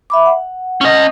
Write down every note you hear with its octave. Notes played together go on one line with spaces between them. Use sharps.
E5 B5 D6
F#5
C#4 D#5